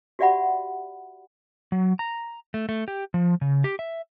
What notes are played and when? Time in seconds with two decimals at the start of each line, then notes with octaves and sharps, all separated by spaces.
0.19 F#4 G4 D5 E5 F#5 B5
1.72 F#3
1.99 A#5
2.54 A3
2.69 A3
2.88 G4
3.14 F3
3.41 C#3
3.64 G4
3.79 E5